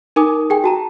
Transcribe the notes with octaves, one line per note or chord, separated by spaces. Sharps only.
D#4 A#4 G#5 D6 D#6
G#4 G5 G#5
F#4 A5 A#5